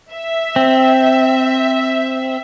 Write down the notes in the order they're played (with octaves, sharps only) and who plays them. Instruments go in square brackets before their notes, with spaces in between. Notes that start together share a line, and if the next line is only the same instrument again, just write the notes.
[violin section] E5
[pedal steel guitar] C4